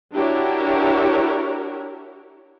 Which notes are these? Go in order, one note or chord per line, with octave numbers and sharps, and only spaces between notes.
D4 E4 F#4 G4 A#4 C#5